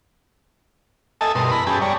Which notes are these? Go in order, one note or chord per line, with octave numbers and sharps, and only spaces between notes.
A4 D#5 E5 G#5 A5
G2 B2 A#4 C6 D#6
E4 B4 A#5 B5
F#2 C#4 G4 G#4 A5 B5
G3 C#5 D5 A#5